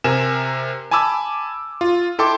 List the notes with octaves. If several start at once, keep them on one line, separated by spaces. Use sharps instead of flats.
C3 A#4 G#5 E7
G#5 A5 B5 D6 E6
F4
E4 A4 G5 C6 D6